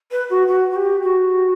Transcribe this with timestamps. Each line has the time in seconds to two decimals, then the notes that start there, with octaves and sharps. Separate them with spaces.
0.11 B4
0.30 F#4
0.47 F#4
0.70 F#4
0.75 G4
1.03 F#4